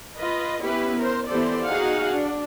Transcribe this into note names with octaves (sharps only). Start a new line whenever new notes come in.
F4 B4 D#5
B3 C#4 E4 G4 B4
A#4 C5
E3 B3 G4 A4 C5 D5
D#4 F#4 G#4 F5 F#5
D4